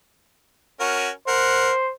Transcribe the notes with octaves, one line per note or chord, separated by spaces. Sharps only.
C#4 F#4 A#4
A#4 C5 F#5